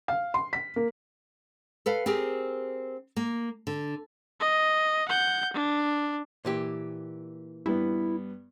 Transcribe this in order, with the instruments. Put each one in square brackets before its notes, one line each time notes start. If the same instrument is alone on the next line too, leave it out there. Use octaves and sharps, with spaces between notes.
[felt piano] F5
C6
B6
A#3
[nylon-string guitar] A4 B4 F5
C4 G4 G#4 A#4
A#3
D3
[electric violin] D#5
F#5 G6
D4
[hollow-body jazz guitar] A#2 E3 G4
[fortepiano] G2 B3 [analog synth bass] E4